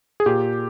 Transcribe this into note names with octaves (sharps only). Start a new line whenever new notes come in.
G#4
A#2 G4